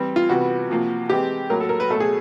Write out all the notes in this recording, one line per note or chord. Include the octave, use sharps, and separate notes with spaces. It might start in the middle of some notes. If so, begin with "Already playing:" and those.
Already playing: E3 G3 C4
F4
C3 E3 G3 B3 F#4
C3 F3 A#3
E3 G#3 C4 G4
A2 F#3 A#3 A#4
A4
A#4
B4
B2 F#3 A3 A4
G#4